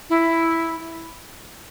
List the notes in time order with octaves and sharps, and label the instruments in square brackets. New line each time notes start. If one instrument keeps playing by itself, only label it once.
[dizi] E4